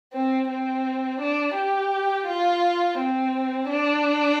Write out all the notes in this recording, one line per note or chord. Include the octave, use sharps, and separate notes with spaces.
C4
C4
D4
G4
F4
C4
D4